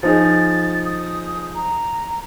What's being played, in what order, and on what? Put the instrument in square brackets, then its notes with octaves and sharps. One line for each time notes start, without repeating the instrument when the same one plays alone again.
[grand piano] F3 D#4 G#4 [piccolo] A6
[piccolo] D#6
A#5